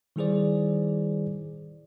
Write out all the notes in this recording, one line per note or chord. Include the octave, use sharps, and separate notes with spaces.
D#3 G3 E4 G#4 C5 D5